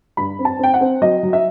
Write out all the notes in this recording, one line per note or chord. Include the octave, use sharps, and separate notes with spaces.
G2 B5
C4
A5
C4 G5
F#5
C4
F#3 D#5
F#3
E5